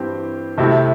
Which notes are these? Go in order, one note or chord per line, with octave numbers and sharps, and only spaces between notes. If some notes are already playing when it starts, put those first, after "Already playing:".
Already playing: G2 E3 C4 G4
C2 C3 A3 E4 G4